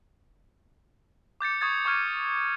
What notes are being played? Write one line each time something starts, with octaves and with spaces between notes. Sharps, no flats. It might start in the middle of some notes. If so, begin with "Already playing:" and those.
D6 G6 A6 C#7
C#6 D#6 G#6 A6
C#6 D6 F6 G#6 D#7